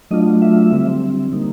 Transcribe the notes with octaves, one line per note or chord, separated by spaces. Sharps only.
F#3 A3 D4 F4 D#5
E5
D3 G3 C4
D3 G3 A#3 D#4